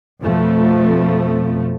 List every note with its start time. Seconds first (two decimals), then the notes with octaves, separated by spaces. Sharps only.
0.21 F2 B2 F3 A3